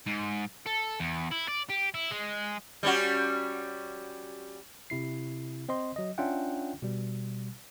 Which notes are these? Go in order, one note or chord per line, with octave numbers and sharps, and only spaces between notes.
G#2
A4
E2
E4
D5
G4
E4
G#3
G3 C#4 F#4
C3 E4 C7
C4 C5 D#5 C6
F#3 D#5
C#4 D4 F4 E5 F#5 G5
B2 G3